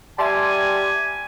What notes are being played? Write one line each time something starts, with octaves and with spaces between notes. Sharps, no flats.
G3 E5 G#5 A5 C6